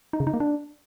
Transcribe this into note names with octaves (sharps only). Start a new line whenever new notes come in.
D#4
C#3
D#4
A#3
D4